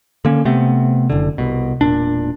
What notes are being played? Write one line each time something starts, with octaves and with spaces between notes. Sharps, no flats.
D3 A#3 C#4
C3 A3 B3 C4
F#1 D3
C2 B2
E1 A#2 D4